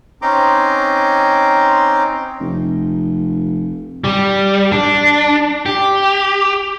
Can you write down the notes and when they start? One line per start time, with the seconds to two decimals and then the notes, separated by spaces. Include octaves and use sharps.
0.22 C4 C#4 D#4 A#5 C6 D6
2.41 F1
4.04 G3
4.72 D4
5.66 G4